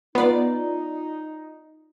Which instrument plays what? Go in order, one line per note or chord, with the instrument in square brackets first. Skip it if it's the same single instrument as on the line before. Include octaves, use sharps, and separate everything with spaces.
[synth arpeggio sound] B3 [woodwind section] D#4 [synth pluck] F4 D5